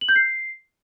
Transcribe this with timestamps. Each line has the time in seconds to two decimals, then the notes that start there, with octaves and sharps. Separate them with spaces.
0.01 F#7
0.09 G6
0.16 C7